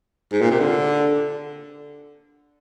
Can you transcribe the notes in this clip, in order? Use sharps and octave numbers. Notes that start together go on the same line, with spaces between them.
G#2
A#2
C3
D3